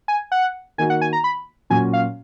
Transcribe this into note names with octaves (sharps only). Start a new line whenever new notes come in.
G#5
F#5
D#3 A#3 D#4 F#4 G#5
F#5
G#5
A#5
B5
A#2 F#3 C#4 F#4 G#5
F5